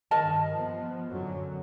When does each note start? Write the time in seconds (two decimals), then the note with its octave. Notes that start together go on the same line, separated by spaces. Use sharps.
0.11 G2 D#3 A#4 D#5 A5
0.53 F3 B3
1.09 F#2 D3 F#3